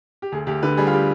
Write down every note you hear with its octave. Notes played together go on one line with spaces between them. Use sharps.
G4
D2 G#4
D2 G4
D3 B4
G3 G#4
F4
G4